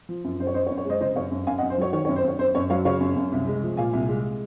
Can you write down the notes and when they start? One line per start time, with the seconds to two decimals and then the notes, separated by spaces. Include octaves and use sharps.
0.09 F3
0.24 F#2
0.40 F#2 C5
0.47 C#5
0.54 F#2 C5 D#5
0.67 C#5
0.70 F#2
0.78 C#5
0.85 G#3 C5 D#5
1.01 C#3 C5 D#5
1.16 F#2 C#5 F5
1.31 F#2
1.47 F#2 F5 G#5
1.58 D#5 F#5
1.63 F#2
1.70 C5
1.78 F#3 C#5
1.93 D#3 C#5
2.05 C#5
2.09 F#2
2.16 C5
2.24 F#2 C#5
2.39 F#2 C5
2.55 F#2 C#5
2.70 F#3 C#5 F5
2.85 C#3 C#5 F5
3.01 F#2
3.16 F#2
3.32 C2
3.48 G#3
3.62 F3
3.77 A#2 F5 G#5
3.93 C2
4.09 G#3